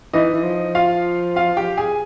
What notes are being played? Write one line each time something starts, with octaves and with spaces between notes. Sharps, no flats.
E3 D#4 D#5
E3
F3
F4 F5
F4 F5
G4 G5
G#4 G#5